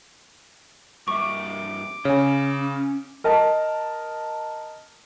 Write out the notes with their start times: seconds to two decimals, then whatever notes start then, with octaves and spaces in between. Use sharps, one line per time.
1.08 G2 A#3 E5 C#6 D6
2.05 C#3 C#4 C#5 G#5
3.24 A#4 D#5 A5